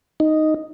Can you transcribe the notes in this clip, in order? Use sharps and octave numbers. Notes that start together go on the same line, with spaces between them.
D#4